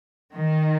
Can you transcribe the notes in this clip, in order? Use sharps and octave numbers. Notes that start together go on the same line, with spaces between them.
D#3